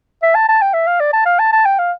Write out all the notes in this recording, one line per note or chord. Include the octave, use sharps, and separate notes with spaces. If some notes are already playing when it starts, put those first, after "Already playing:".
E5
A5
A5
G5
E5
F5
D5
A5
F5
A5
A5
G5
F5